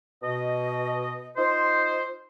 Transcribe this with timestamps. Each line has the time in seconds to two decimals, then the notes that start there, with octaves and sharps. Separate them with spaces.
0.22 B2 D#5
1.37 D#4 F4 C5